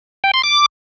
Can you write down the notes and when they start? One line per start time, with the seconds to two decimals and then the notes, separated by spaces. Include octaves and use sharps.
0.24 G5
0.34 C6
0.44 D6